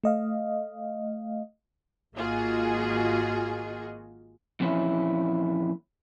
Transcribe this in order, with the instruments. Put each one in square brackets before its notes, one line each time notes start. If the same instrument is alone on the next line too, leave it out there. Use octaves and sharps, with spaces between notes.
[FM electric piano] A3 D#5 F5
[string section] G#1 A#3 F4 F#4 G#4 D#5
[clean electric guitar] F2 A#2 E3 C#4 E4